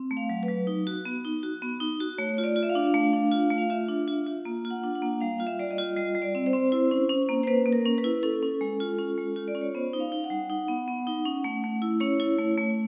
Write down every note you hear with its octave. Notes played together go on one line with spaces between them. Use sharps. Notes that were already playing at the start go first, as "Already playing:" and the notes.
Already playing: C4
A3
F5
F#3
B4
F#3
D#4
F#4
B3
D#4
F#4
B3
D#4
F#4
A3 C#5
F4
D5
F4
E5
F5
D4
A3 F5
D4
F4
A3
F5
F4 E5
D4
F4
F4
A#3
F4
F#5
D4
F#5
A#3
G3 F5
F4 F5
E5
G3 D5
D#5
F4
G3 D#5
G3
D5
C4
C5
C4
E4
C#4
C#4
A#3
C5
A#3 B4
A#3
A#4
C#4
B4
E4
C#4 A4
C#4
G#3
F4
C#4
G#3
F4
D5
C#4
C#5
B3 C5
D#4
F5
D#4
F#5
G3
D#4 F#5
B3
B3
D#4
C#4
A3
A3
E4
C#4 C#5
E4
A3
A3